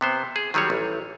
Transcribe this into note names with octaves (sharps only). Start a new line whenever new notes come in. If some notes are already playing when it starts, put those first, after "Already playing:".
C3 B3 C5
G#4
D#3 F#3 G3 G#4 C#5
A1